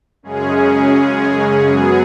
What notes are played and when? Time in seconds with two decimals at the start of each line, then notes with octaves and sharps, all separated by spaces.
0.23 F#2 C#3 G#3 C#4 G#4
1.66 F#2 F#3 B3 G#4